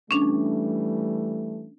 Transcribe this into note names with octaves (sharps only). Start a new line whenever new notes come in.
E3 G3 A3 C#4 D4